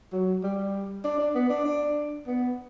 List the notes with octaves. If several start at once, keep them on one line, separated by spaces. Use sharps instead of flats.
F#3
G3
D4
D4
B3
D4
D4
B3